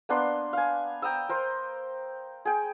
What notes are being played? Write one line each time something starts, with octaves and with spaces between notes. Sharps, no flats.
A#3 B3 D4 C6
F5 G#5
G5 A#5 D#6 E6
A#4 C5
G#4 G5